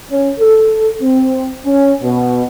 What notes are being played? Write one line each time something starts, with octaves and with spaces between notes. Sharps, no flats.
C#4
A4
C4
C#4
B2